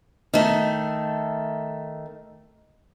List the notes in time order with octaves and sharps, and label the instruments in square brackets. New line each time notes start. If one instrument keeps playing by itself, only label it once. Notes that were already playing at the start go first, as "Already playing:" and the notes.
[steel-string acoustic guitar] D#3 A3